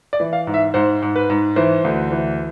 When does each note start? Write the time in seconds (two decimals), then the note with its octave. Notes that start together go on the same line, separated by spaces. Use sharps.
0.13 D5
0.20 E3
0.33 F5
0.47 G#2
0.54 E5
0.74 G#2 C5
1.02 G#2
1.15 B4
1.30 G#2
1.56 E3 C5
1.84 D2
2.11 E3